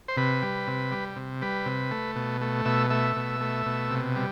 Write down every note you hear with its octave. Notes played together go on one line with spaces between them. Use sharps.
C5
C3 B4
G3
C3
G3
C3
G3 B4
C3
A3
B2
A3
B2 E5
A3 E5
B2
A3
B2
C3
G3